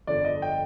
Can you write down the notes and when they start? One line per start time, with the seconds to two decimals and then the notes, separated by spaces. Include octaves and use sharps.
0.07 G1 F2 D3 D5
0.25 D#5
0.42 G5